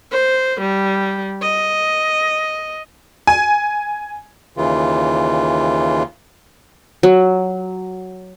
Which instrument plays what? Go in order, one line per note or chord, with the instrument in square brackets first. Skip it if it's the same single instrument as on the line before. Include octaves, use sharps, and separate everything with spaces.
[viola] C5
G3
D#5
[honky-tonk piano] G#5
[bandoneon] D#2 C#3 E3 F4
[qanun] F#3